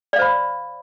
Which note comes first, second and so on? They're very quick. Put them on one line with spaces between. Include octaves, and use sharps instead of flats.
D5 F5 C5 B5